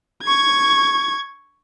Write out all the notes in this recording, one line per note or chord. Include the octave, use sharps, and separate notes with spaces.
C#6 G#6